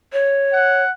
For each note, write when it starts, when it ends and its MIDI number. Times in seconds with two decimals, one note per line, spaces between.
0.13 0.83 73
0.53 0.92 78